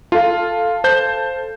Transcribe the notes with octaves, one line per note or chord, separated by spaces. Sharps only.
F4 A4 F5
C5 A5 G6